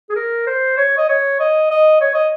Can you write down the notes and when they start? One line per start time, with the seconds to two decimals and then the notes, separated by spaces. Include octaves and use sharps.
0.10 G#4
0.16 A#4
0.47 C5
0.78 C#5
0.97 D#5
1.09 C#5
1.40 D#5
1.71 D#5
2.01 C#5
2.14 D#5